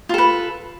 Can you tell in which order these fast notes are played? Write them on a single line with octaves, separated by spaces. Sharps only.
F4 A4 B4